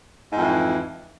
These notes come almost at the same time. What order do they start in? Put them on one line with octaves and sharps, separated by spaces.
G#2 F2 E3